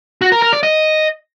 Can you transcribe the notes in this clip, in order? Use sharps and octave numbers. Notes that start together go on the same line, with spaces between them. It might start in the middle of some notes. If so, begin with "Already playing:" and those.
F#4
A#4
A#4
D5
D#5